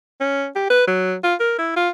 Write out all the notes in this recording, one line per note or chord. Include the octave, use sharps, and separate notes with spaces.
C#4
G4
B4
F#3
F4
A#4
E4
F4